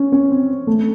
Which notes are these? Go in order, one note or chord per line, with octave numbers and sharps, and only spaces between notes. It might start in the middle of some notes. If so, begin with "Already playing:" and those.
Already playing: C#4
C#4
C4
A3